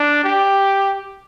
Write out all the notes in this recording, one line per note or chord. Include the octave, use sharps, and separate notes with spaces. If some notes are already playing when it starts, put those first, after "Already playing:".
Already playing: D4
G4